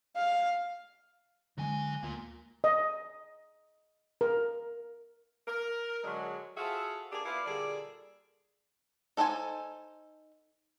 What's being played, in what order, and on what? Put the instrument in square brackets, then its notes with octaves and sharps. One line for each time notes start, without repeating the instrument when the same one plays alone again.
[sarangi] F5
[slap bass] D3 G#3 [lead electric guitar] F#3 G#5
[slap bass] D2 [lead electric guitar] A#3 F4
[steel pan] D#5
A#4
[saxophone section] A#4
D3 F#3 G#3
F4 F#4 G#4 A4 C5 E5
A#3 D4 G4 G#4
B3 E4 F4 D5 F5
A#2 D3 G3 G#4 A4 D5
[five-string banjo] D#4 A4 C5 D5 G#5